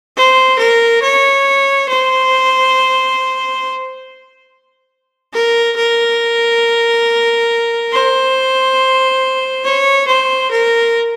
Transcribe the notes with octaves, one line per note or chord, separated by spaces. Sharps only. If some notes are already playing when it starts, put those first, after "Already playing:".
C5
A#4
C#5
C5
A#4
A#4
C5
C#5
C5
A#4